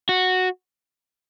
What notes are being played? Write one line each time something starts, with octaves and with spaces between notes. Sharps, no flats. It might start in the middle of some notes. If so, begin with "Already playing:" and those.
F#4